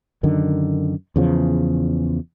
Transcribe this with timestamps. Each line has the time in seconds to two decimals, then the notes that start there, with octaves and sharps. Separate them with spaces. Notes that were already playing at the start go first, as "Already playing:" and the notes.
0.23 F#2 D3 D#3
1.16 E2 C#3 F3